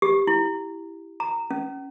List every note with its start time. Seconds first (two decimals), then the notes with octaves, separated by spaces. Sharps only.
0.02 G4
0.27 E4
1.20 A#5
1.51 C#4